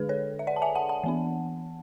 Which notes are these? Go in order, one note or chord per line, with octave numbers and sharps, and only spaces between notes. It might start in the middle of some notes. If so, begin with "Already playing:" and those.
Already playing: D3 G#3 D4 G#4 B4
A4 C#5
E5
D5 F#5
A5
E5 G#5
F#5 A5
F#5 A5
E3 B3 D4